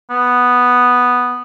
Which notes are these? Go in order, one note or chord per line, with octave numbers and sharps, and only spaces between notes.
B3